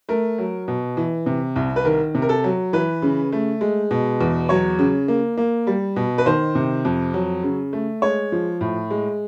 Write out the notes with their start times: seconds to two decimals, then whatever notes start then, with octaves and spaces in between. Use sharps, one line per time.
0.09 A3 A#4
0.38 F#3
0.68 B2
0.97 E3
1.26 C3
1.56 C2
1.76 B4
1.85 D#3 A#4
2.15 C3
2.22 A#4
2.29 A4
2.44 F#3
2.73 E3 B4
3.02 C#3
3.32 A3
3.61 G#3
3.91 B2
4.21 E2
4.49 F#3 C#5
4.79 C#3
5.08 A#3
5.37 A#3
5.67 G3
5.96 B2
6.18 B4
6.26 D#3 C5
6.55 C3
6.85 F2
7.14 F#3
7.43 C#3
7.73 A3
8.02 G#3 C#5
8.32 F3
8.61 A2
8.90 G#3